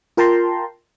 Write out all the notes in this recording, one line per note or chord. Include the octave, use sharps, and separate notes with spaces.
F4 A#4 G5 A5 A#5 C6